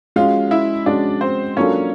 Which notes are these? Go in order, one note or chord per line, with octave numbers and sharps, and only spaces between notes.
G#3 C#4 F4 F#4 F5
F5
E4 E5
G#3 C#4 D4 F#4 D5
C4 C5
F#3 A#3 C#4 D4 F4 A4 C#5